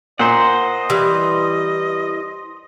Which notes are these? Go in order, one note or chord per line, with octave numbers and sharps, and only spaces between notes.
A#2 C5 D#5 F#5
E3 G3